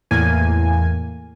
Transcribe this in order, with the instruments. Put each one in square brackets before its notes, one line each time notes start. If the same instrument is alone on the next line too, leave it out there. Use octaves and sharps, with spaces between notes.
[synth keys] E2 A2 A#3 G#5